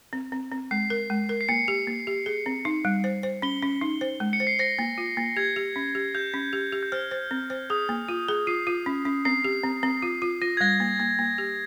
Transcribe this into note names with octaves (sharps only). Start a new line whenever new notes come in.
C4
C4
C4
G#3 C7
A#4
G#3
A#4
C7
A#3 C#7
G4
A#3
G4
G#4
C4
D#4
G3
C5
C5
C#4 G7
C#4
D#4
C5
G#3
C#7
C5
C7
C5 A#6
A#3
F4
A#3
G4 G#6
G4
C#4
G4
G4 G6
C#4
G4
G4
G6
C5 F6
C5
C4
C5
G#4 D#6
A#3
F4
G#4
F4 C7
F4
C#4
C#4
C4 C7
G4
C4
C4
F4
F4
F4 A#6
G#6
G3 A#6
A#3
A#3
A#3
G4